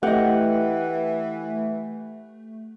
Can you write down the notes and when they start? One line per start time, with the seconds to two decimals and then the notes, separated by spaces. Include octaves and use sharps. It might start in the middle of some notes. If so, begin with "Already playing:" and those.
0.03 E3 A3 G4 D#5 F#5